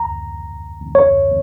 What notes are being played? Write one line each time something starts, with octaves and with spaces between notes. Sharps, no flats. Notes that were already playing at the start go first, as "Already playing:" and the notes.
Already playing: A#5
C#5